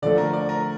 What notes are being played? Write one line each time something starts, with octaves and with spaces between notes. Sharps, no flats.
D3 F3 A3 D5
A#4
D5
A#4